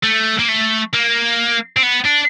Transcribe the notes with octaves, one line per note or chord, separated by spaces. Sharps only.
A3
A#3
A3
A#3
C4
B3
D4